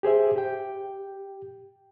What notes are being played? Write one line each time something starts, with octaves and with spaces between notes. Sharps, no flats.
G4 G#4 C5 E5
G4 G5